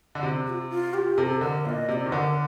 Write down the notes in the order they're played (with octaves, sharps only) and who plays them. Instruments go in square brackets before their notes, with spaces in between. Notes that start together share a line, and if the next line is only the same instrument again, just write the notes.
[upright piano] D3
C3
[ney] G4
F4
F4
G4
[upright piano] C3 [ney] A4
[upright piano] D3 [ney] A#4
[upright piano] A#2 [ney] D#5 F5
[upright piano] C3 [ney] D#5
[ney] D5
[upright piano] D#3
[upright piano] D3 [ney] A#4